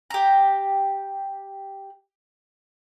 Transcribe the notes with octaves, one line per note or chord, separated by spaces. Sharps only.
G4 A#5